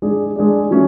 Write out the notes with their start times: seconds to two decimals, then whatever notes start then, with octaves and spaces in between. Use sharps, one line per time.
0.02 G#3 D4 G#4 D5
0.36 G#3 D4 G#4 D5
0.71 F#3 A3 C#4